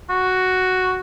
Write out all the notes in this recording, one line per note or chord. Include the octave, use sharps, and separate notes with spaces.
F#4